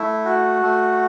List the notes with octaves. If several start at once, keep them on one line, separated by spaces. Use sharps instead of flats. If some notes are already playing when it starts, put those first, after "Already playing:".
Already playing: A3 E4
F#4
A3